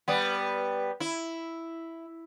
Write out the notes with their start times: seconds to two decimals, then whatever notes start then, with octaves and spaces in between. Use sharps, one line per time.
0.08 G3 B3
1.00 E4